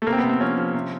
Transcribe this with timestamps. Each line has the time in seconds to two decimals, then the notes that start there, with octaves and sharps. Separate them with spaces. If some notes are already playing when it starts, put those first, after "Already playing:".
0.02 A3
0.07 C3 A#3
0.13 C4
0.18 B3
0.24 C3
0.29 C4
0.40 F3 C#4
0.57 F3
0.74 C3